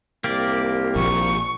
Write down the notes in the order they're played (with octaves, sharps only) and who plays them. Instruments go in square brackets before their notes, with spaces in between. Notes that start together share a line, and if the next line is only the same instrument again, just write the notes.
[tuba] C2 [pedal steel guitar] A#3 G4 D5
[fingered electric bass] A#1 A#2 [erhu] C#6